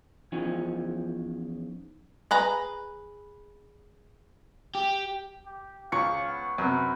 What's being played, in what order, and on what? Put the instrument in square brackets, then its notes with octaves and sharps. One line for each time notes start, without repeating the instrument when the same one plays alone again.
[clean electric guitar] E2 F3 C#4 D#4 C#5
[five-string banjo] G#4 B4 A#5
[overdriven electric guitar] G4
[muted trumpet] G4
[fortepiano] C#2 [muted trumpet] F5 [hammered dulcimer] C#6
[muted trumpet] B3
[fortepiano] F#2 C3 [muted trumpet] B4